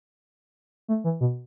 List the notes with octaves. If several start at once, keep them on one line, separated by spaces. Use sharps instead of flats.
A3
E3
B2